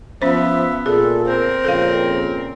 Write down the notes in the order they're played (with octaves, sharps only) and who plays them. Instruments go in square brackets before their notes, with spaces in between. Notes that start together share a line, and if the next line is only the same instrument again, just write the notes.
[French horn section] F3 [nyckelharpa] B3 [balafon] C#4 C5 [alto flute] E5
[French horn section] A#2 [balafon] G#4 [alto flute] A4
[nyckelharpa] C4 A#4 [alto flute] C5
[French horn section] F2 A#2 C#3 [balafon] A4 F5